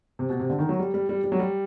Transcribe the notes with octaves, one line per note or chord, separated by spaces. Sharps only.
C3
B2
C3
D3
D#3
F#3
G3
G3
G3
G3
F#3
G3